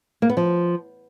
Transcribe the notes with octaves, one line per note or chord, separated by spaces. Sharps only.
A#3
B3
F3